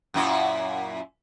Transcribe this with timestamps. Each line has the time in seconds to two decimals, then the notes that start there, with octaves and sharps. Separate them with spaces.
0.14 F#2 A#2 E4